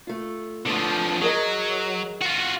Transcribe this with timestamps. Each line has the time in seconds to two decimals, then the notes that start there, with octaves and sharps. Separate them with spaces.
0.07 A3 F4
0.66 D3 F3 A3 B3
1.21 F#3 G#4 A#4 D#5
2.21 F4 F#4